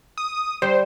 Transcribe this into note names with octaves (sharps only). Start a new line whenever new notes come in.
D#6
G3 C5